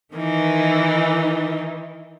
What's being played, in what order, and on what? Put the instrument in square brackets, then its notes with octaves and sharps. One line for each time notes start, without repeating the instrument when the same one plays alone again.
[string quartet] D#3 E3 D#4